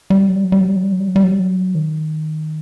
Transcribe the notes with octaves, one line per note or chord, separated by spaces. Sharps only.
G3
F#3
G3
F#3
G3
F#3
G3
F#3
G3
F#3
G3
F#3
G3
F#3
G3
F#3
D#3